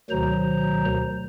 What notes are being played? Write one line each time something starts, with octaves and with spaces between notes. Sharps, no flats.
D2 B2 D#3 F#3 C5 A#5